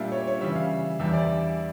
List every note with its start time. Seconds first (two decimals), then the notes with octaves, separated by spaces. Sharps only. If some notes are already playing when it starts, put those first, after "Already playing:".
Already playing: A#2 G3 A#3 D4 E5
0.12 C#5
0.27 C#5
0.41 C#3 E3 G3 E5
0.56 F5
0.99 E2 E3 G3 D4 E5
1.13 D5